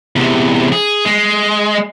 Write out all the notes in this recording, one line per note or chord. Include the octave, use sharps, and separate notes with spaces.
E2 C3
G#4
G#3